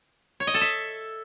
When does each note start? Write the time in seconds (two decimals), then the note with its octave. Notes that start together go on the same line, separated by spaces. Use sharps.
0.40 C#5
0.47 D#5
0.54 A4
0.61 E5